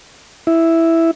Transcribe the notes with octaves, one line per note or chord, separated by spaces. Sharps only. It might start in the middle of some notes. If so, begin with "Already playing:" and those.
E4